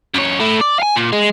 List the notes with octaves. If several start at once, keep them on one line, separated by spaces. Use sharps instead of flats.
F#2 C#5
A3 E4
D5
F5 G#5
A#2
G#3